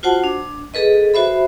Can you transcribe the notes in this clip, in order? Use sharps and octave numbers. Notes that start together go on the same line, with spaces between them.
F4 F#4 C5 F#5 A5
D4
G#4 A4 B4 D#5
F#4 C5 E5 B5